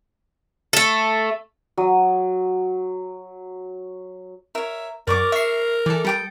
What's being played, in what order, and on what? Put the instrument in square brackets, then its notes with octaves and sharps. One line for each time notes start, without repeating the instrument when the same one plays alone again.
[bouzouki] A3 A4
[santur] F#3 D#6
[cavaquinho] A#4 C#5 [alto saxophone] E5
[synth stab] F#2 [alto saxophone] A#4 [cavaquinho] D5 C#6 D6
[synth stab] E5 C7 [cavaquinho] C#6
[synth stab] E3 A4 [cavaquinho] D5
[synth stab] G3 [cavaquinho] A4 G5 D#6